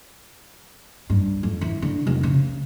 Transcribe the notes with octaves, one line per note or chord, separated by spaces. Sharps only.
G2
F2
E3
D3
F1
C#3